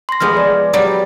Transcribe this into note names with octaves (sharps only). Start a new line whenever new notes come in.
C6 A#6
F3 G#3 B3 G#4 F6
D5
F#3 G3